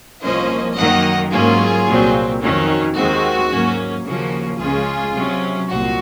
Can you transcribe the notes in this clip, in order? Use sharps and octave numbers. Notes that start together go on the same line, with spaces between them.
C2 A#2 F3 A#3 C#4 C5 D#5
F#2 D#3 F#3 A#3 D#5 F#5
G#2 F#3 A#3 C#4 F4 G#4
C2 A#2 F#3 C4
F2 D#3 F#3 C#4
D#2 D#3 G#3 C4 F#4
G#2 F#3 A#3 C#4
D#2 C#3 F3 A#3 C#4 F#4
C#2 C#3 G#3 C#4 F4 G#4
C3 F#3 C#4
C2 A#2 F#4